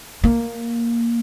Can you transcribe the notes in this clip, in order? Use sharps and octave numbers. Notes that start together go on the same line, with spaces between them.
A#3